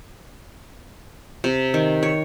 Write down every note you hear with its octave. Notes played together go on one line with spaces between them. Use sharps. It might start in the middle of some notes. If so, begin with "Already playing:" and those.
C3
D#3
C#5